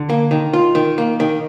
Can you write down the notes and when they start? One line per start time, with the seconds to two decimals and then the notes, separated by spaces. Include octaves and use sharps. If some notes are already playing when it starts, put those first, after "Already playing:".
Already playing: D3
0.10 A#3
0.31 D#3
0.53 F4
0.75 D#3
0.98 A#3
1.20 D#3